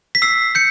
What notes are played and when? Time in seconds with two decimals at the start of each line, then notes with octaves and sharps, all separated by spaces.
0.15 B6
0.22 E6 C7
0.55 G6 C#7